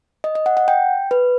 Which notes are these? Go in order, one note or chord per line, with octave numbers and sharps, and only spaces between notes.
D#5
D#5
F#5
F#5
G5
B4